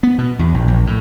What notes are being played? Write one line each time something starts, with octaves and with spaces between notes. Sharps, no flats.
B3
B2
E2
A#1
A#1
A2